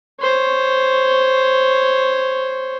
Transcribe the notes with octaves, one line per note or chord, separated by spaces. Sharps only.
C5 C#5